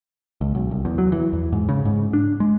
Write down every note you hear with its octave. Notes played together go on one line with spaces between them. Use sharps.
C#2
B1
C2
E2
F#3
E3
E2
G#2
C#3
G#2
D4
G#3